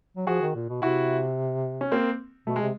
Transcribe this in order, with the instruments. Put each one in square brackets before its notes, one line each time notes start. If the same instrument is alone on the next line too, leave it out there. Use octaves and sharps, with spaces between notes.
[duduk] F#3
[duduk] F3 [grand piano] F#4 G#4
[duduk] D#3
A#2
B2
[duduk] C3 [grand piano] E4 F#4
[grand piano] C#4
A#3 C4
[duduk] B2 [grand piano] A3
[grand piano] G#3
[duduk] C3